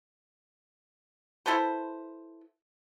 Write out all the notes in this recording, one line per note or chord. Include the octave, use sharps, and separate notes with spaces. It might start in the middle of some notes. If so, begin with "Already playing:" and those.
E4 A4 B4 C5